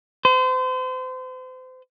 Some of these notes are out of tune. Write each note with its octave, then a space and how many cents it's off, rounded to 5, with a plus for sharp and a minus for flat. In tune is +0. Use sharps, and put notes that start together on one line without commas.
C5 -35